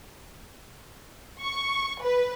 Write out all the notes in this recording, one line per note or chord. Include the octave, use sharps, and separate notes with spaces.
C#6
B4